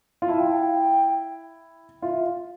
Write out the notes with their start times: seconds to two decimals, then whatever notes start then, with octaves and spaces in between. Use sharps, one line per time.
0.22 F4
0.28 E4 A5
0.40 G5
0.52 F5
0.63 G5
2.02 F4 E5